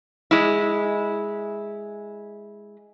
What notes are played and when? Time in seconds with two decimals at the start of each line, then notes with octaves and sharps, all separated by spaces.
0.31 G#3 E4